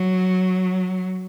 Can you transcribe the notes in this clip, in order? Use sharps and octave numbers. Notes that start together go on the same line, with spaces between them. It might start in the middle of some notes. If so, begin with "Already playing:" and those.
Already playing: F#3